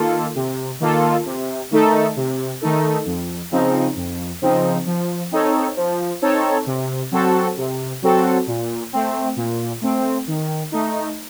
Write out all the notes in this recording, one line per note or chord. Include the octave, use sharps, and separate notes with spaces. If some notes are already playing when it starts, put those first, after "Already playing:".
Already playing: D#3 A#3 F4 A4
C3
D#3 A#3 F4 A4
C3
D#3 A3 D#4 A4
C3
D#3 A3 D#4 A4
F2
C#3 F3 C4 D#4
F2
C#3 F3 C4 D#4
F3
C4 D#4 A4 C#5
F3
C4 D#4 A4 C#5
C3
F#3 C4 F#4 A4
C3
F#3 C4 F#4 A4
A#2
A3 C4
A#2
A3 C4
D#3
A3 D#4